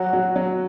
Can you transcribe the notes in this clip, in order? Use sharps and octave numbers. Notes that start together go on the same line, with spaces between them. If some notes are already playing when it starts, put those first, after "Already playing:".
Already playing: F#3 F#4
F#3
F#3